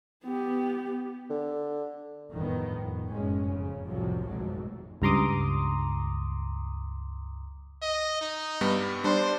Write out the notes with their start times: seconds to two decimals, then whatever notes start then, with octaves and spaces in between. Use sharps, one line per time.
0.24 B3 G4
1.30 D3
2.31 G1 F2 A2 D#3 B3
2.78 F2
3.09 F#1 F#2 A2 G#3 C#4
3.50 F2 G#2 C#3
3.86 C2 F2 A2 C3 F3 F#3
4.25 G#1 F2 G#2 B2 F#3 A3
5.02 C#2 G2 A#5 C6 D6 D#6
7.82 D#5
8.21 D#4
8.61 G2 G3 B3
9.04 G3 D4 C5 C6